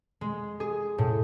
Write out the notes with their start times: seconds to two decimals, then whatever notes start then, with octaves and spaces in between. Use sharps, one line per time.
0.21 G#3
0.60 G#4
0.98 A2